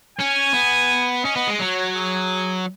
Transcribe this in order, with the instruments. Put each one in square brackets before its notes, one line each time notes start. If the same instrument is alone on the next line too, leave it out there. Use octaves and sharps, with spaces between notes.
[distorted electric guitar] C#4 [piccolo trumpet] G#5
[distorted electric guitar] B3
[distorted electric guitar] C#4 [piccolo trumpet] D#5
[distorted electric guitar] B3
G#3
[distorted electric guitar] F#3 [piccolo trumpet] C#5
[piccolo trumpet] G#4